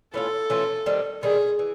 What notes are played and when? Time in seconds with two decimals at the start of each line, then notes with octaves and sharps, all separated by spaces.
0.13 E3 A3 C#4 F4 A4
0.50 E3 A3 C#4 F4
0.86 D#3 G3 C4
1.23 D#3 G3 C4 G#4
1.59 E3